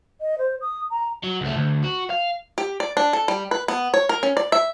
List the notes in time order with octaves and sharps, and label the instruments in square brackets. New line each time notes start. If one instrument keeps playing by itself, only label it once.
[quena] D#5
C5
D#6
A#5
[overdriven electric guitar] F#3
C#2 A3
D2
F#4
F5
[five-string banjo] G4
D5
D4
A4
G3
B4
B3
C#5
A#4
C#4
D5
E5